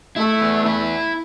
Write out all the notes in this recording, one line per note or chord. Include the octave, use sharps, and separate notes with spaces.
A3 E4
B3
E4